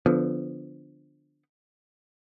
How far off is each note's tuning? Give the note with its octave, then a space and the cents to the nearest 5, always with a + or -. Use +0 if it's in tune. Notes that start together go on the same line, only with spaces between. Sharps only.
D3 +0 F3 +0 B3 +20